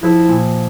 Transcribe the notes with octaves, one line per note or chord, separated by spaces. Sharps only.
F3 E4
A#2